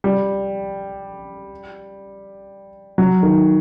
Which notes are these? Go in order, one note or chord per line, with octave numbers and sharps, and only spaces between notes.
G3
F#3
D#3